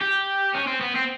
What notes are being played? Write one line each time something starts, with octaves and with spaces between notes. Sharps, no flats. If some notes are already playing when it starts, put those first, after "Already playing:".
G4
C#4
C4
B3
C4